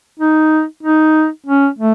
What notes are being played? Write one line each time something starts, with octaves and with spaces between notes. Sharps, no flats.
D#4
D#4
C#4
A3